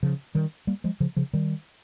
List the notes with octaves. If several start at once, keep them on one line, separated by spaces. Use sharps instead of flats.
C#3 F3
D#3 G3
G3 A#3
F3 G#3
C#3 F3
C#3 F3
D#3 G3